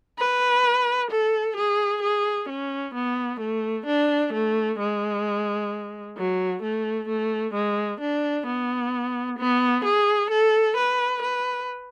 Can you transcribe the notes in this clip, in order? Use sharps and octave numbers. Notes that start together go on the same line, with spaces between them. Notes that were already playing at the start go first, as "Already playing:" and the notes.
B4
A4
G#4
G#4
C#4
B3
A3
D4
A3
G#3
F#3
A3
A3
G#3
D4
B3
B3
G#4
A4
B4
B4